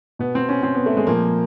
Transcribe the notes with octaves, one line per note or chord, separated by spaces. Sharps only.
B2 B3
C4
C#4
C4
B3
A3
G#3
A#2 F3 A#3